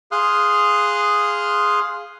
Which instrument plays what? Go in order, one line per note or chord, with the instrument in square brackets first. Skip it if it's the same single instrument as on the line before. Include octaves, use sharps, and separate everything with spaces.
[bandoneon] G#4 F5 C6 D#6 F6 F#6